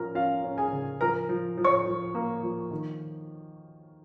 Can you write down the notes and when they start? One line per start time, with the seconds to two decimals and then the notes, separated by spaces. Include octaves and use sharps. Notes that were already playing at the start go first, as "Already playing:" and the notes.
Already playing: F3 C#4 A#4 A#5
0.15 C#4 F4 F5
0.44 C#4
0.57 G#4 G#5
0.72 C#3
1.01 F3 A#4 A#5
1.29 F3
1.57 F3
1.64 C#5 C#6
1.86 F3
2.15 A#3
2.43 F3
2.71 D#3